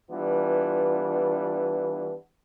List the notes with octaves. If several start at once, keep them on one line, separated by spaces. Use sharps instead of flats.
E3 G3 B3 D4 F4